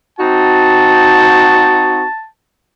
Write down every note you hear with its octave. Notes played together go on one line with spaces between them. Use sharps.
C4 D#4 F#4 A5